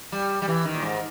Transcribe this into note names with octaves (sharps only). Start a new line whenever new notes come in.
G3
G3
E3
D#3
A#2
G#2